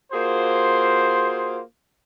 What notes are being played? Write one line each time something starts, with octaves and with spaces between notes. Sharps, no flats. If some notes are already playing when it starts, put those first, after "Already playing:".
A#3 F4 F#4 G#4 C5